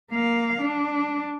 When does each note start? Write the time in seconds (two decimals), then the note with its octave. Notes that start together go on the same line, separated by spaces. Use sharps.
0.11 A#3 F5
0.61 D4